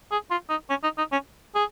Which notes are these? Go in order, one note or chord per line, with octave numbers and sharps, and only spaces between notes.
G#4
F4
D#4
C#4
D#4
D#4
C#4
G#4